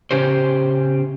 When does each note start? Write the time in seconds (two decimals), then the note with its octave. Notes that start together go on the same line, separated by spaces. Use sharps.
0.11 C#3 C#4 G4 C5